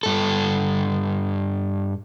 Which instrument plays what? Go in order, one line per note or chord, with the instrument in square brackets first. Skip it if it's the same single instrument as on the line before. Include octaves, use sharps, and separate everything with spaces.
[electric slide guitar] G2 A4